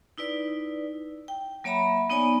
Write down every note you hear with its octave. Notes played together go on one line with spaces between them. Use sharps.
D#4 E4 B4 D5
G5
F#3 A#3 C#5 E5 A#5 B5
B3 D#4 C#5 D5 G#5